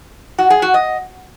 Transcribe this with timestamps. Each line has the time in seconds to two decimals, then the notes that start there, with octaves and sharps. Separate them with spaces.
0.39 F#4
0.50 G#4
0.62 F#4
0.74 D#5